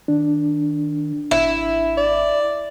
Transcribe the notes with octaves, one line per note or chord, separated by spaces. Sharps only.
D#3 D4
G#1 E4
D5